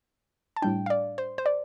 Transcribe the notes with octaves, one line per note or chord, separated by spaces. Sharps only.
A5
A2 G3 D4 G5
F5
D5
C5
C5
D5